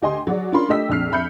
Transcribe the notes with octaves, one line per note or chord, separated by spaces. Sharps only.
D2 G4 D#5 G#5 C6
F#3 F#4 G#4 D5
C#4 D4 F4 A#4 B5 C6
A3 D4 G4 D#5 E6 B6
A#1 F2 F6 C7
F2 E5 B5 G6 C#7